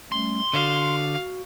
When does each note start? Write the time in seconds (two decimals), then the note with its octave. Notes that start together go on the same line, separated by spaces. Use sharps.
0.12 G3 A3 C#4 C6
0.53 D3 F#4 F5